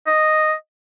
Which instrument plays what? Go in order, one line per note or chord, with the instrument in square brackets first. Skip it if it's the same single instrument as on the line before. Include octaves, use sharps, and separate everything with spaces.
[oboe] D#5